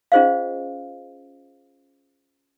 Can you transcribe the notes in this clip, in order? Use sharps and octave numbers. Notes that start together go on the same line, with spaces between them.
C#4 F4 G#4 C5 D#5 F5